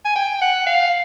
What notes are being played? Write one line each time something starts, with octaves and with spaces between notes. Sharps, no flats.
G#5
G5
F#5
F5